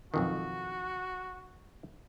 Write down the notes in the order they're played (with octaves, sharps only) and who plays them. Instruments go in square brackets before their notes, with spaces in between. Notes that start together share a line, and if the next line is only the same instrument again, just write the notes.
[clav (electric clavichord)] B1 F2 D#3 [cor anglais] F#4